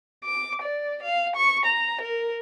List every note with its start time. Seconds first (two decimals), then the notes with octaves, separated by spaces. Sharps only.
0.25 D6
0.62 D5
1.03 F5
1.36 C#6
1.66 A#5
2.02 A#4